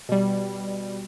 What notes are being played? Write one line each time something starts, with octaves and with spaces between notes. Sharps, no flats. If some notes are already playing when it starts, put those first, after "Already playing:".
B2 G3